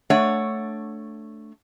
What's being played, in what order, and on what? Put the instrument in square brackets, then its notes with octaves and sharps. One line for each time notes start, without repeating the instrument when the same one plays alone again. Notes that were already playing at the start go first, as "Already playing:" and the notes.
[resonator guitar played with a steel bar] A3 D4 C#5 F#5